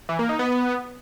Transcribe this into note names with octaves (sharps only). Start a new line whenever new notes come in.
E3
A#3
D#4
B3